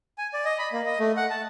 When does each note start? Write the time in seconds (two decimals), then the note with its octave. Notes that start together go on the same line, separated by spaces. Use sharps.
0.18 G#5
0.33 D5
0.45 D#5
0.59 B5
0.73 A#3
0.86 D#5
0.99 A3
1.17 F#5
1.30 A5